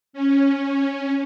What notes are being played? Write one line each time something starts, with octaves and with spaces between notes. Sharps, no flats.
C#4